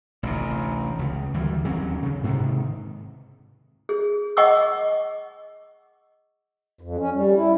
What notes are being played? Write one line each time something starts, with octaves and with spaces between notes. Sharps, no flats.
A1 D2 C3
C#2 C#3
D2 E3 G3
D#2 F#3 C4 C#4
C#3
G#2 C3 D#3
G#4
D#5 F#5 G#5 C#6 D6 E6
F2
C#4
G3
E4